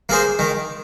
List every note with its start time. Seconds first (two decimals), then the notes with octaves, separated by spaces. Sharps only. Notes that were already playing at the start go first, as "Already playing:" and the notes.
0.09 A#3 G#4 C5
0.39 D#3